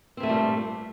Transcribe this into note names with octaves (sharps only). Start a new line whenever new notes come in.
G2 A#2 G3 A3 C4